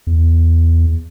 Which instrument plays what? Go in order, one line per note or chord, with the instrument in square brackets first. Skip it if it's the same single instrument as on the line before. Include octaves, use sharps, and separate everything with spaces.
[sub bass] E2